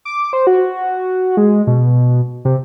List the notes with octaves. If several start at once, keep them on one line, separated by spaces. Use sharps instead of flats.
D6
C5
F#4
G#3
B2
C3